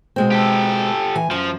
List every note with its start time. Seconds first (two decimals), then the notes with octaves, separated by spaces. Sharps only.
0.16 B2 G#3 C4
0.31 G4 A4
1.15 E3 G#5
1.31 F#2 F3